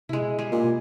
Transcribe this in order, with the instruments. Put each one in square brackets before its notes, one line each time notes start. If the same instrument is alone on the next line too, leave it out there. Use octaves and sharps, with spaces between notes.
[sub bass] C3 [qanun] G#3 E4
[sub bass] B2
[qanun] G3 G#3 G#4
[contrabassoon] A#2
[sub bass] B2